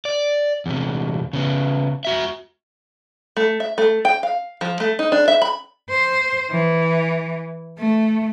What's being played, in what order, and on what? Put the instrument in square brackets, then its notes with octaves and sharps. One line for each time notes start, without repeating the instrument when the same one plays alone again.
[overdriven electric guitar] D5
E2 C3
C#3 B3
F#4 E5
[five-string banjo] A3
E5
A3
G5
F5
F3
A3
D#4
D4
E5
B5
[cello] C5
E3
A3